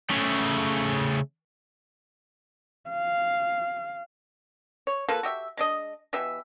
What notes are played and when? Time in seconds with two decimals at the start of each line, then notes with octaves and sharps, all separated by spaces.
0.10 C#3 A3
2.89 F5
4.87 C#5
5.09 A#3 F4 A4 B4
5.23 F#4 G4 E5
5.57 G#3 D4 D#5
6.13 B2 E3 G4 E5